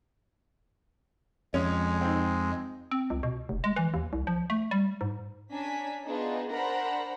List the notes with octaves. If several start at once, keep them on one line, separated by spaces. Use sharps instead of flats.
F2 G#3 C#4
C4 D#4
C4
C#2
B2
F1
G#3
E3
D#2
C2
F3
A3
G3
G#2
C#4 D4 G#5 A#5 B6
B3 D4 D#4 F4 G#4 B4
D4 A#4 C5 F#5 A#5 B5